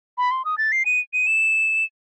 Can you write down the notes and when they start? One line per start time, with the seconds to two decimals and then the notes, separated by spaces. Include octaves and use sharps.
0.18 B5
0.31 C6
0.45 D#6
0.58 A6
0.72 C7
0.85 D#7
1.13 D#7
1.27 E7